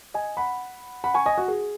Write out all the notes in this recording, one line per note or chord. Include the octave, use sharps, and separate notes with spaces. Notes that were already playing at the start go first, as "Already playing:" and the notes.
D#5 G#5
F#5 B5
F#5 B5
G#5 C#6
D#5 G#5
F#4
G#4